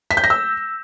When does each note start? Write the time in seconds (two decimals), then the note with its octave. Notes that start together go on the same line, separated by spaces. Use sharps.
0.11 B6
0.17 G6
0.24 A#6
0.30 E6